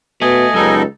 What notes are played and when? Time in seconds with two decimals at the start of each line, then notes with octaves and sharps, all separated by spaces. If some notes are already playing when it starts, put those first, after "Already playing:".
0.22 B2 A3 D#5 G#5
0.54 C#2 F#2 G3 A#3 D#4 A4